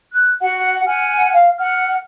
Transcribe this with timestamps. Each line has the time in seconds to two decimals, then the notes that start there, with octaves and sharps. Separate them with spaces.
0.13 F#6
0.41 F#4 F#5
0.86 F#5 G#5 F6
1.32 F5
1.59 F#5 F6